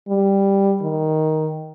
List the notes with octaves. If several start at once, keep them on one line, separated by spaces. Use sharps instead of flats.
G3
D#3